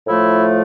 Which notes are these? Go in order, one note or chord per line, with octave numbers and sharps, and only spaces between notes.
A2 F3 A3 E4